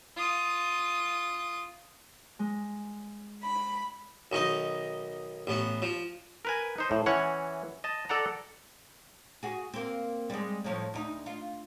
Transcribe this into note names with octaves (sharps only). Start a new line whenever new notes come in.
F4 D#6
G#3
B5
B1 D#3 D#4 D#5
A1 B3 F#5
F3
A#4 B4 G#5
D#4 C5
A2
E3 C#4 C#5 F#5
D#5 A5
A4 D5 F#5 A#5
F#4 G#4
A#3 C4
G3 G#3
A2 F3 C#5
D2 D#4
F4